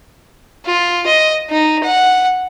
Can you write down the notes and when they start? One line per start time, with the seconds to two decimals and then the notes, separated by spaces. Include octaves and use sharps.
0.66 F4
1.07 D#5
1.50 D#4
1.83 F#5